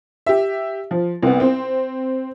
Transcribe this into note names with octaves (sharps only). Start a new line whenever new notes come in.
G4 E5
F3
C2 B3
C4